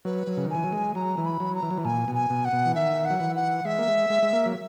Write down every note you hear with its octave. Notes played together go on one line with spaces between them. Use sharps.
F#3 B4
F#3
C#3
D#3
E3 G#5
F#3
G#3
F#3 A#5
E3
B5
F#3
A#5
E3
F#3
E3
A#2 G#5
B2
G#5
B2
F#5
B2
E3
D#3 E5
F#5
F#3
E3
F#5
G#3 E5
A#3
G#3
G#3
G#3
A#3
F#3